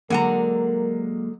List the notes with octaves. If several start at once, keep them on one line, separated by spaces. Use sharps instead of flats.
D3 F#3 G#3 A#3 A#4 F#5 A#5